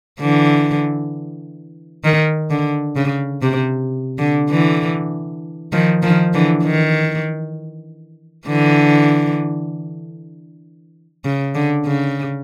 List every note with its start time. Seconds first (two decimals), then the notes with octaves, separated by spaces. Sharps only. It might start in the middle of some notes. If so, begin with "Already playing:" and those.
0.20 D3 E3
2.04 D#3
2.51 D3
2.96 C#3
3.42 C3
4.19 D3
4.50 D3 E3
5.73 D#3 F3
6.03 D#3 F3
6.34 D3 E3
6.64 D#3
8.48 D3 E3
11.25 C#3
11.55 D3
11.86 C#3